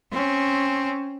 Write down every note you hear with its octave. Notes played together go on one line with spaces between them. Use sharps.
C4 C#4